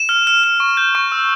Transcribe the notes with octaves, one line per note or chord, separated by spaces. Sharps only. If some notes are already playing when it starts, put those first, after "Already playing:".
Already playing: E7
F6
F6
F6
C#6
G6
C#6
E6